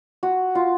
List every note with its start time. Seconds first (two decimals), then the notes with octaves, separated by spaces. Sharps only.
0.23 F#4
0.55 F4